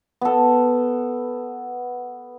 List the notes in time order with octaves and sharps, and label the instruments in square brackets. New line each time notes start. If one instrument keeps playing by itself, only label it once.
[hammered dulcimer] B3 A4